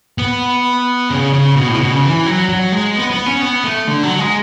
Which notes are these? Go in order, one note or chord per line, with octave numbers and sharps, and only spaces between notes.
B3
C#3
C#3
B2
A2
C#3
B2
C#3
E3
F#3
F#3
G#3
B3
B3
C#4
B3
A3
D3
F#3
G#3